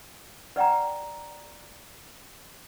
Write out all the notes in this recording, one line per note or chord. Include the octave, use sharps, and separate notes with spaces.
B4 D5 F#5 G5 A#5